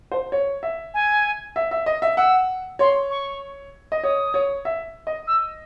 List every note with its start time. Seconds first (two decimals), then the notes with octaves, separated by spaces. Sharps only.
0.12 C5
0.32 C#5
0.63 E5
0.94 G#5
1.56 E5
1.71 E5
1.86 D#5
2.02 E5
2.17 F#5 E6
2.79 C#5 C6
3.10 C#6
3.92 D#5
4.03 C#5 D#6
4.34 C#5
4.65 E5
5.07 D#5
5.27 E6